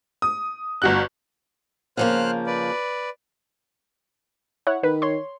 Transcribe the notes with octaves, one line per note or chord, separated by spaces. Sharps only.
D#6
G1 F#4 F#6
C#3 F3 A#3 C5 F6 F#6
B4 D5
E4 C#5 F#5
D#3 B4
C#5 C6